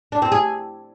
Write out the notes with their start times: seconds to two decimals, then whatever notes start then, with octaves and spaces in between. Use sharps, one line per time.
0.12 D4
0.22 C4
0.32 G#4